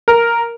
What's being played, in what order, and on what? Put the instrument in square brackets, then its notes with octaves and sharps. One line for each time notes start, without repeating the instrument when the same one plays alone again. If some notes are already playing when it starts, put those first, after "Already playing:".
[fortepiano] A#4